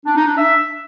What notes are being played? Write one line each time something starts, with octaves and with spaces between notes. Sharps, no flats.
D4
D#4
D4
E5